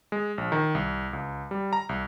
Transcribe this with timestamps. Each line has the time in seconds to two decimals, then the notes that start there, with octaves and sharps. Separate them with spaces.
0.12 G#3
0.38 A#1
0.52 D#3
0.75 C2
1.13 C#2
1.51 G3
1.73 A#5
1.89 C2